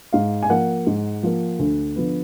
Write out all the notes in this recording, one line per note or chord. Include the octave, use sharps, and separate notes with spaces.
G#2 F5
G#5
F3 A#3 F#5
G#2
F3 A#3
D2
D3 F3 B3